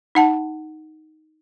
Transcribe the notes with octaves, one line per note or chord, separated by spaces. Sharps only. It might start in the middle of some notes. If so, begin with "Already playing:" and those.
D#4 F#5 A5